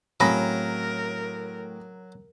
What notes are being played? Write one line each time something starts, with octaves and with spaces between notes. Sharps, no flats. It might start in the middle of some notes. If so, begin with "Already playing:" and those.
A2 C#3 F#3 C4 A#4 A#5 B5